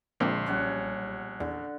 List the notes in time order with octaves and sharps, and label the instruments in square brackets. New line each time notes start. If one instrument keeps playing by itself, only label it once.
[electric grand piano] A#1 [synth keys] A#2 D3 G#3 [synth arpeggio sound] A#3 C4 D4 [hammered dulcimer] C5
[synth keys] B1 G3 [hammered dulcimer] C#4 C#5 F#5
[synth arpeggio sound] E2 [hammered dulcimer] D3